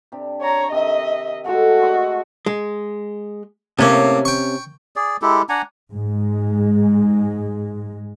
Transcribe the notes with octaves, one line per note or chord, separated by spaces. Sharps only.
C3 D4 G4
C#5 A#5
C3 D#3 D#5 E5
G#3 A3 F#4 A4
D#5 E5 C6
G#3
A2 C3 A#3 C#4
G5 C#6
G#4 D5
G#3 E4 G4 A4
D4 F#5 G#5 A#5
G#2 G#3